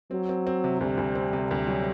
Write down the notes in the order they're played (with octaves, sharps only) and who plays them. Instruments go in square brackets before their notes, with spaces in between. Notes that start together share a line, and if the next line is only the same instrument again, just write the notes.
[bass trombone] F#3 [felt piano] C4
[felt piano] C4
C4
C3
[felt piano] D2 [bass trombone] G3
[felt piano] D2
C4
C3
D2
F#3